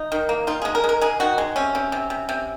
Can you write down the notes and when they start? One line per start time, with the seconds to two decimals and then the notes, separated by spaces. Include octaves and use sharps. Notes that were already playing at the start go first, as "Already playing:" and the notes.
Already playing: D#4
0.12 D#3
0.29 A#3
0.47 D#3 F4
0.62 G#3 G#4
0.75 A#4
0.84 G#3
0.89 A#4
1.01 G#3 G#4
1.20 D#3 F#4
1.38 G#3
1.56 C3 C#4
1.75 C3
1.92 C3
2.10 C3
2.29 C3